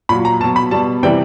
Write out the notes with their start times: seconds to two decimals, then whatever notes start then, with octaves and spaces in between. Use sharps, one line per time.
0.09 A#2 B5
0.12 F#3
0.25 A#5
0.40 B2 A5
0.44 F#3
0.56 B5
0.71 B2 G3 A5
1.03 C3 E3 G3 G5